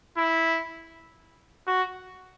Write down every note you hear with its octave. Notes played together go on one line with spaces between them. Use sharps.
E4
F#4